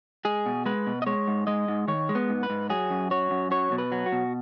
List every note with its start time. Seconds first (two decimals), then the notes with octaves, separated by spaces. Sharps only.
0.25 G#3 G#4
0.46 B2
0.66 G#3 B4
0.87 B2
1.02 D#5
1.06 G#3 C#5
1.28 G#2
1.47 G#3 D#5
1.68 G#2
1.88 D#3 C#5
2.09 G#3
2.15 B3
2.29 G#2
2.43 B4
2.50 G#2
2.70 F#3 G#4
2.90 F#2
3.11 F#3 C#5
3.31 F#2
3.51 F#3 C#5
3.72 B2
3.78 B4
3.92 F#3
4.06 F#4
4.12 B2